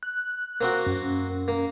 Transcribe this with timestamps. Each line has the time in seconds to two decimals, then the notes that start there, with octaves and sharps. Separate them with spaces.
0.03 F#6
0.61 A#3 C4 F#4
0.86 F#2
1.48 A#3